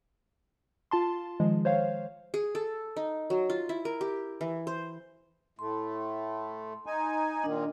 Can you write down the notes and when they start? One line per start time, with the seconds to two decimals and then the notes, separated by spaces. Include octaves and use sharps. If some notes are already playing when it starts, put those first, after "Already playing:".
0.91 F4 A5 C6
1.40 D#3 F3 G#3
1.65 C5 C#5 F5
2.34 G#4
2.55 A4
2.96 D#4
3.30 F#3
3.50 F4
3.69 E4
3.85 A#4
4.01 G4
4.41 E3
4.67 C5
5.59 A2 A3 C6
6.86 D#4 G#5
7.44 A#2 D#3 D4 D#5